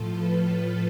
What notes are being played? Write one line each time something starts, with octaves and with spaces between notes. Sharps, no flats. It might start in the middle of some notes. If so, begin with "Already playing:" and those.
Already playing: A2 F3 F4 A4
B4